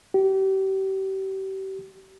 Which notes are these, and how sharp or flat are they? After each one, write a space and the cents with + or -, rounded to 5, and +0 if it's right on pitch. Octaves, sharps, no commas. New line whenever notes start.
G4 -35